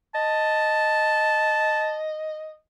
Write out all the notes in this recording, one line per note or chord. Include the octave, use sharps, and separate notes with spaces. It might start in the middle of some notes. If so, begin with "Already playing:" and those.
D#5 A5